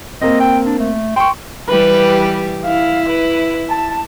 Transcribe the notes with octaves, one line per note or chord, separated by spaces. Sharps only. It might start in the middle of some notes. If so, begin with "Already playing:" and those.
A#3 C4 D#5
G5
D4
A3
G5 C6 C#6
E3 G3 G4 B4
E4 F5
B4
A5